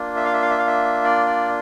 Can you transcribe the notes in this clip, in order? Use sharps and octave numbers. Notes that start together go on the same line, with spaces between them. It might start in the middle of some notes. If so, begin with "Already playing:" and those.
Already playing: A#3 D4 F4
E5
F5
E5
F5
E5
F5
E5
D5
D5